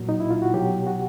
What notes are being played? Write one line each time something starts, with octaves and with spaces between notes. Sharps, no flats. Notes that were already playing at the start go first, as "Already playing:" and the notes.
Already playing: A#2 F#3 F#4
D#4
E4
F4
F#4
B2 F#3 G4
F#4